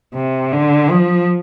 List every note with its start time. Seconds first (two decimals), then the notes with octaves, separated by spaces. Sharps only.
0.14 C3
0.52 D3
0.90 F3